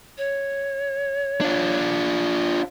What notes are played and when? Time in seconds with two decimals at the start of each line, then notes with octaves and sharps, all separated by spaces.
0.18 C#5
1.41 D4 F4